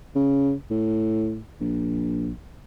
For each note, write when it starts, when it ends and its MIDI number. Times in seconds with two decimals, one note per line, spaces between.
0.16 0.52 49
0.70 1.39 45
1.61 2.30 34